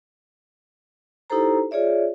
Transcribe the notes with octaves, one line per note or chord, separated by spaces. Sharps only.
D#4 E4 G4 A4 C5 A#5
F4 G#4 C#5 D5 E5